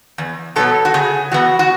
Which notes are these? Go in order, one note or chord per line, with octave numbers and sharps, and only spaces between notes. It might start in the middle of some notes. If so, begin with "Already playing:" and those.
E2
B2 F#3 B3 A4
F#4
C#3 G#4
E3 B3 F#4
F#4